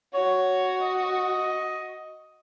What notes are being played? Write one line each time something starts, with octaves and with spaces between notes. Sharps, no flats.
F#4 C#5
D#5